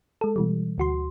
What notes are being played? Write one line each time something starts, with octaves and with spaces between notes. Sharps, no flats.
G#3 A4
B2 E3 G3
D2 F#4 C6